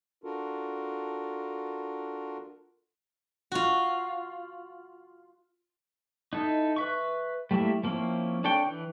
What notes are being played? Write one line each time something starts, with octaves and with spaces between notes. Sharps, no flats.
D4 F4 F#4 A4 A#4
F4 F#4
D#4 E4 A4
B4 E5 C#6
G3 A3 A#3 E4 E5
F3 A#3 C4 C#4 E4
D4 A4 C#5 G5
E3